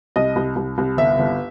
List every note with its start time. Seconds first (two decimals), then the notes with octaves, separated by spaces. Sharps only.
0.16 C2 D#5
0.36 C2
0.56 C2
0.78 C2
0.97 G1 E5
1.19 G1